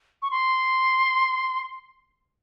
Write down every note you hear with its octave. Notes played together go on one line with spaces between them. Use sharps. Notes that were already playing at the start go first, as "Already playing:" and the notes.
C#6
C6